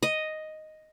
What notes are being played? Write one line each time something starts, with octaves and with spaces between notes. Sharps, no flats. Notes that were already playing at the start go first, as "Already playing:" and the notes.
D#5